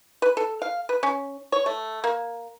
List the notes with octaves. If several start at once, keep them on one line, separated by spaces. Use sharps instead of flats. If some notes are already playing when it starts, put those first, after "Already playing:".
B4
A4
F5
B4
C#4
C#5
A3
A#3